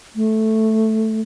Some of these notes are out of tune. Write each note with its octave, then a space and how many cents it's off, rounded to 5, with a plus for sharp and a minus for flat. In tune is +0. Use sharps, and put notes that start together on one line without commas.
A3 +0